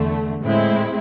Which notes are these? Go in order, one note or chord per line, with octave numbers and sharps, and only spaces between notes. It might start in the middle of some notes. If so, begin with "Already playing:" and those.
Already playing: E2 D3 A3
A2 G#3 C4 E4